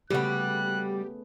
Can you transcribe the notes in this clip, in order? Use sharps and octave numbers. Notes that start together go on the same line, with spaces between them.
C#3 G3 A3 B3 F#4 G4 F#6